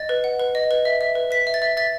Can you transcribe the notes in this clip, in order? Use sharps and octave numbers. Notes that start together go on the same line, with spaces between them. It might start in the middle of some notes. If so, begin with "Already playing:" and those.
Already playing: D#5 A6
B4
F#5
B4
D#5
B4
E5
E5
B4
B4 B6
E5
A6
E5
E5 A6